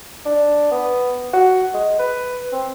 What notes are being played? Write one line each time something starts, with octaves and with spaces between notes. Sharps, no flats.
D4
B3
F#4
G#3
B4
C4